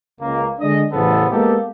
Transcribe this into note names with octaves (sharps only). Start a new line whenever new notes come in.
C#2 A#3
D3 G#3 D4 D#5
A1 E2 C#3 F3 B3 A4
G#3 A#3 B3 D#4 G4 A4